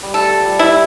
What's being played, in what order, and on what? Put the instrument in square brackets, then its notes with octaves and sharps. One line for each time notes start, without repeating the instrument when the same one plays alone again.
[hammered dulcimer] G3
[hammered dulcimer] A3 [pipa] A4
[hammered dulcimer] F3 G3
[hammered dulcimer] E3 [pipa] E4